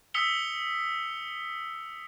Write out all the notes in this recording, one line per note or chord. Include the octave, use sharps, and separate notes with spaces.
D#6 E6 B6 C#7 F7 G7